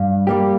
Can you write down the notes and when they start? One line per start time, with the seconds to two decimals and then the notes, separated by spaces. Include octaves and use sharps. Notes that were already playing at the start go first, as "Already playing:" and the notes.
Already playing: G2 F5
0.27 G3 A#3 G4